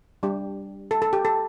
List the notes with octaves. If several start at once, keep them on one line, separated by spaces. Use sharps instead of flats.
G3 D4 G4
A4
A4
G4
A4